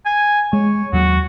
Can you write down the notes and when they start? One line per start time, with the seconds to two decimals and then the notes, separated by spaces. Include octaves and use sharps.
0.06 G#5
0.53 G#3 C#5
0.93 D#2 F#3 F#4